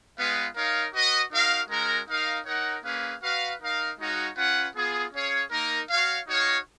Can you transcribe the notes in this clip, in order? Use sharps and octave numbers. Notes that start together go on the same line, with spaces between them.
G#3 B3 F4 B4 F5
D#4 A#4 C#5 F5
F#4 B4 D#5
D#4 F#4 A#4 F5
G#3 C#4 F#4 A#4
D#4 A#4 F5
D#4 A#4 C#5 F#5
A#3 C#4 G#4 B4 F5
F#4 B4 F5
D#4 A#4 F5
G#3 D#4 F#4 C#5 F5
C#4 F4 B4 F#5
B3 F4 G#4
C#4 G#4 C#5 F5
A#3 D#4 A#4
F#4 C#5 F5
D#4 F#4 C#5 F5